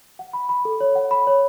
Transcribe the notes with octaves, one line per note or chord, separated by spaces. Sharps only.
F#5
B5
B5
A4
C#5
F#5
B5
C#5